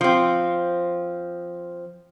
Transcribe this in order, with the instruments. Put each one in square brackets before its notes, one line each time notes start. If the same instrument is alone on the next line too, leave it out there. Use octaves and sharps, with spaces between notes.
[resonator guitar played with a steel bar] F3 C4